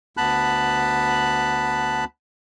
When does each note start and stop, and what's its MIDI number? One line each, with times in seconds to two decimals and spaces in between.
0.17 2.05 38
0.17 2.05 59
0.17 2.05 81
0.17 2.05 83
0.17 2.05 90